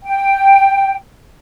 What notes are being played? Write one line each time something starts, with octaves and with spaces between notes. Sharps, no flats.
G5